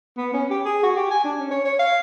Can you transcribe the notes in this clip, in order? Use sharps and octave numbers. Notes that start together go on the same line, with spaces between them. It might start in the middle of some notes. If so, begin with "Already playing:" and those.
B3
C#4
G4
G#4
F#4
G4
G#5
D4
C#4
C#5
C#5
F5